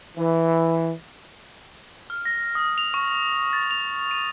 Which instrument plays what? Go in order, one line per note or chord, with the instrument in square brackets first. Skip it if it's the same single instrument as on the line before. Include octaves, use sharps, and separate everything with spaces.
[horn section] E3
[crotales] F6
A#6
D#6
F7
C#6
A6
F7
D#7